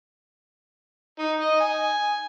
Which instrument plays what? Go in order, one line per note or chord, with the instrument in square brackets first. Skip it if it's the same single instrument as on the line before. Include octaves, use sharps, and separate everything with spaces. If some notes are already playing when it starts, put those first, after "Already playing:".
[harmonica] D#4
D#5
G#5